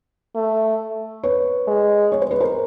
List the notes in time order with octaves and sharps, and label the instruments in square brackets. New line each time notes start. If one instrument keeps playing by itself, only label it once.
[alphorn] A3
[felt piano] B4 C#5
[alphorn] G#3
[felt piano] C#5
C5
B4
A#4 C5